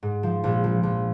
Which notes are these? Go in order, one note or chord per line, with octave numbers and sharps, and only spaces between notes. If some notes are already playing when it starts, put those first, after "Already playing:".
G#2
F3
A#1
F3
A#1